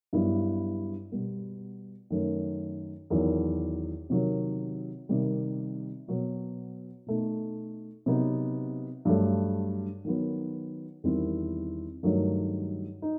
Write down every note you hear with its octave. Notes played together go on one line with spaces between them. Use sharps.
G2 F#3 B3 E4
B2 G3 B3
F#2 D#3 A3
E2 D#3 F#3
C3 D#3 F#3
C3 D#3 G3
B2 F#3 B3
B2 A3 D#4
C3 F#3 B3 D#4
G2 F#3 A3
D#3 F#3 B3
E2 D#3 G3 C4 E4
G2 D#3 F#3 A3 D#4
D#4